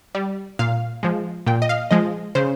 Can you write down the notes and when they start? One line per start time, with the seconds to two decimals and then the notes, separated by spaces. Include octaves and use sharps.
0.15 G3
0.59 A#2 F5
1.03 F3 G#3
1.46 A#2 G5
1.62 D#5
1.69 F5
1.91 F3 G#3 D#5
2.35 C#3 C5